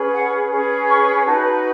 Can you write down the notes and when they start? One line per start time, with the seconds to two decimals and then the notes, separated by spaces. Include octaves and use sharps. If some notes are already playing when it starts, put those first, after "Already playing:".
Already playing: C#4 G#4 B4
0.13 F#5
0.51 C#4 G#4 B4
0.88 C#6
1.25 D#4 F#4 B4 A5